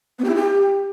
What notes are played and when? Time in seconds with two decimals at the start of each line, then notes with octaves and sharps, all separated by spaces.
0.19 B3
0.24 G4
0.29 E4
0.35 G4